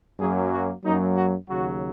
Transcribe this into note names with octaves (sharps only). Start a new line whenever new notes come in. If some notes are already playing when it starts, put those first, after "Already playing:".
F#2 F#3 A#3 G#4
F#4
F#2 F#3 A#3 D#4
F#4
D#2 C#3 F#3 F#4